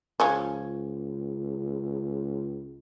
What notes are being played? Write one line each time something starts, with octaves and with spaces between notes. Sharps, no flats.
C#2 F3 G#3 C#4